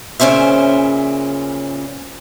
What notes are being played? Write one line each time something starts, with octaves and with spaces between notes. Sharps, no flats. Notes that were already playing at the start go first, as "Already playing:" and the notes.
A#2 C#3 C#4 C5 E5